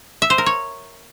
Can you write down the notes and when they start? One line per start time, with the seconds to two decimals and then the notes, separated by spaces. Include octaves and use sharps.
0.22 E5
0.30 C5
0.38 A#4
0.46 C#5